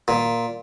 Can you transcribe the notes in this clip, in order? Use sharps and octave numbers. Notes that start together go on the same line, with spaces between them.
A#2